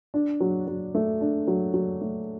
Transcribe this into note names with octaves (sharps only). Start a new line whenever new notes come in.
D4
F#3
F#3
A3
D4
F#3
F#3
A3